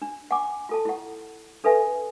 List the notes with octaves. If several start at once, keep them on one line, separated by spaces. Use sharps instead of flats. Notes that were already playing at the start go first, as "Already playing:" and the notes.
D4
F#5 G#5 D6
F4 A4 A5
E4 F#5
D4 A4 B4 E5 G#5